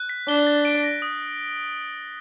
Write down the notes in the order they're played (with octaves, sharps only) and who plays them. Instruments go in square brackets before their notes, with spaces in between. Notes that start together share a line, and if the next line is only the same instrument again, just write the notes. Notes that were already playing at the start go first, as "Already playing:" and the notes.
Already playing: [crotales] F#6
B6
[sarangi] D4 [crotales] G7
[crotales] A6
D7
A#6
D#6